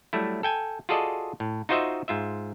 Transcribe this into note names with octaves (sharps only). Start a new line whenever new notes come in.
F#3 G3 A3 E4
A4 G5 G#5
F4 F#4 G#4 A4 D5 D#5
A2
D#4 F4 F#4 C5 D#5 E5
G#2 F4 E5